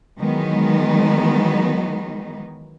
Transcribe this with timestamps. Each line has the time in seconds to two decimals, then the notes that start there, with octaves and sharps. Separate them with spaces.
0.19 D#3 E3 F#3 G#3 B3 D#4